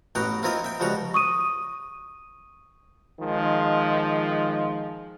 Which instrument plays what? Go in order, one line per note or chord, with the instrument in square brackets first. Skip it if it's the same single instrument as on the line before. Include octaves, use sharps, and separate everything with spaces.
[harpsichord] A1 B3 F#4 G5 A#5
A#3 C4 E4 F4 A#4 D#5
E5 G5
C#2 F3 G3 F#4 A#5
[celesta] C#6 D#6 D#7
[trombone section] D#3 F3 G#3